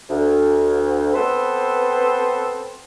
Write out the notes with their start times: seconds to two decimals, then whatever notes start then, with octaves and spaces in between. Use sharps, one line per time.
0.10 D2
1.14 B3 C4 A4 B4 C5